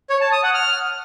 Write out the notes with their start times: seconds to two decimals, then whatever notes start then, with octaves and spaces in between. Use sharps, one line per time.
0.10 C#5
0.21 A5
0.32 D#6
0.43 F#5
0.54 F6